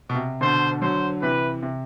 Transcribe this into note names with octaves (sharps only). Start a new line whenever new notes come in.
B2
C3
B2 D3 C5
D3 F#3 C5
C3 E3 B4
C3